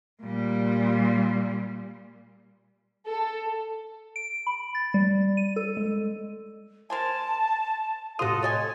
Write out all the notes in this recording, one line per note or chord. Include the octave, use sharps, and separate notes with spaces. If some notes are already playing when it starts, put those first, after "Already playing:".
A#2 G3
A4
D7
B5
A6
G3
D#7
A4
G#3
A#4 C5 G#5 A5
A2 C3 F4 F#4 A4 D#6
C#5 D#5 G#5 A6